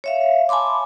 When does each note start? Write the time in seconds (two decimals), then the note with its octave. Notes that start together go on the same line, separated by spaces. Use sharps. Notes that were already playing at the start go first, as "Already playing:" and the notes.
0.04 C#5 E5 F5
0.49 G#5 A5 B5 C6 D6